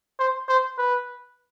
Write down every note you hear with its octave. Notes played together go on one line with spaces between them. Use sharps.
C5
C5
B4